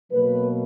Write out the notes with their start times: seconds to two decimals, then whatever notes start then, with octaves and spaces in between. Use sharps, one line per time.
0.11 B2 F#3 A#3 B4